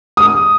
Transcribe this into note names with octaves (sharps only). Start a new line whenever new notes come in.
D#6